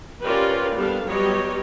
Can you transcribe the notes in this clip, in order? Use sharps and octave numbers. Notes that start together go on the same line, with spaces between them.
C#4 F4 G4 A#4 B4 D5
G3 B3 D4 A4 F5
F#3 G3 B3 G4 C#5 D#5